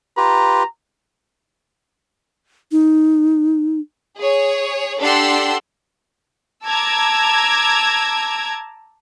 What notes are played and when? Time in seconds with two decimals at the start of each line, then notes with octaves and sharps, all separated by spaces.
0.17 F4 G4 B4 A#5
2.72 D#4
4.20 G#4 C#5
5.00 D4 G4 A4 F#5 C6 E6
6.64 A5 A#5 D6 E6 G#6